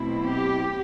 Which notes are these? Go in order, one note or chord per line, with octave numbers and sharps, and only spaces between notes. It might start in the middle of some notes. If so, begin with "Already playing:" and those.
Already playing: B2 F#3 A3 C4 E4
G4